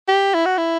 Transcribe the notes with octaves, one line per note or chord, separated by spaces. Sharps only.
G4
E4
F#4
E4